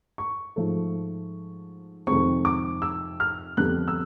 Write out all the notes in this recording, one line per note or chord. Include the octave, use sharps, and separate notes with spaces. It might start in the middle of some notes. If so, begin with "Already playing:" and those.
C#6
G#2 F3 A3
F2 C3 D#3 G#3 C4 C#6
D6
E6
F6
F2 D3 G3 B3 F#6
E6